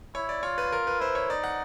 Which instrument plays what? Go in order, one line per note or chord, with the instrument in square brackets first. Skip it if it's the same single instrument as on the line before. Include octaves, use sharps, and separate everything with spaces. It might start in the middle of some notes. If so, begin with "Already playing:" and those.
[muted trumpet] E4 [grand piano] C#5
[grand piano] D5
[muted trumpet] F4 [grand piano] C#5
[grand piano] B4
A#4
B4
[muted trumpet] E4 [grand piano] C5
[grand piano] C#5
[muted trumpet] D#4 [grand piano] D5
[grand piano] F#5